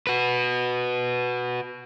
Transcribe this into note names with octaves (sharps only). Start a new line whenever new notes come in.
F#4 B4